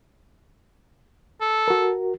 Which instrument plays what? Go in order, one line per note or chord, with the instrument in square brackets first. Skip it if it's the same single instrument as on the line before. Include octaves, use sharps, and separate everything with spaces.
[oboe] A4
[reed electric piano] F#4 A#4